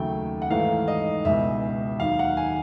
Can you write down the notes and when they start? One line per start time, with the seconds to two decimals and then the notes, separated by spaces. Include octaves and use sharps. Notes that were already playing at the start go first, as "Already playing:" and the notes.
Already playing: D#2 C#3 F#3 A3 G5
0.42 F#5
0.51 G#2 E3 A3 F5
0.88 D#5
1.25 C#2 B2 G#3 E5
2.00 D#2 D#3 F#3 F5
2.19 F#5
2.37 G#5